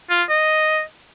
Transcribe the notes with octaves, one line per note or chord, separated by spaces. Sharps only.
F4
D#5